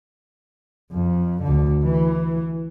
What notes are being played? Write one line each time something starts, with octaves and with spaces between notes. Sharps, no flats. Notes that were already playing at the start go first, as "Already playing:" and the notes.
F2
D2 D3
E3